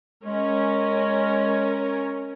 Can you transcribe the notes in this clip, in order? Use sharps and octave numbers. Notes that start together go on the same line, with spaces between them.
G#3 C#4 A#4